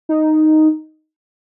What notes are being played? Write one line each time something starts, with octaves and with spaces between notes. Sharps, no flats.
D#4